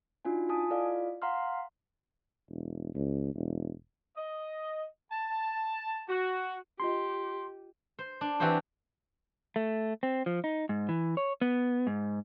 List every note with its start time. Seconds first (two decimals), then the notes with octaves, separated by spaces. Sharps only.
0.25 D4 D#4 F4 F#4 G#5
0.49 F4 G#5 A5 D#6
0.70 E4 F4 A4 D5 D#5 F5
1.22 F5 F#5 A#5 C6 F6
2.50 E1
2.95 C#2
3.35 E1
4.17 D#5
5.12 A5
6.09 F#4
6.80 D4 F4 G4 D#5 C6
7.99 C5
8.21 D4
8.40 E3 C4 F#4 G4 C5
9.56 A3
10.03 C4
10.26 F3
10.44 D#4
10.69 G#2
10.89 E3
11.17 C#5
11.41 B3
11.87 G#2